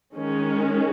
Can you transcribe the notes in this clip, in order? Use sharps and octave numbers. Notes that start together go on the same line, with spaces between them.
D#3 G#3 C#4